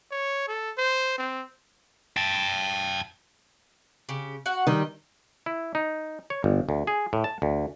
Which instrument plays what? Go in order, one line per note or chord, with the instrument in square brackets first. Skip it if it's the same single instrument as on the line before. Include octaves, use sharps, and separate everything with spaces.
[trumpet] C#5
A4
C5
C4
[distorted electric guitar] G5 A5
[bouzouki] C#3 G4
F#4 F#5
[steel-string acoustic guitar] D#3 G3 [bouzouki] D#5
[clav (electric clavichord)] E4
D#4
C#5
G1
D2
G#4
A2
A5
D2